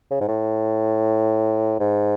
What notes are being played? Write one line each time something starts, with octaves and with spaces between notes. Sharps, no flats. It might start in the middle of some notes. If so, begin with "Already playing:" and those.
C#3
G#2
A2
G#2